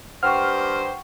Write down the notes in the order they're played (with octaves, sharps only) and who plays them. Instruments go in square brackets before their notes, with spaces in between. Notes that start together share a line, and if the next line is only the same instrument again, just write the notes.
[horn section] G2 G4 C5 [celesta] F#5 G5 C#6 [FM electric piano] F6